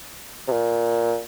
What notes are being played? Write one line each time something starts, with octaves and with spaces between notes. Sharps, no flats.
C3
A#2